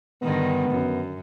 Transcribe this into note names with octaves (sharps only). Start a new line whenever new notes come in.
G2 D3 D#3 B3
F#2